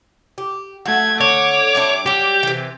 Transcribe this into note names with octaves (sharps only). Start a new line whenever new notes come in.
G4
A3 F#4 G#6
D3 C#5 D6
G3 D4 E4
F#3 G3 G4
C3 E3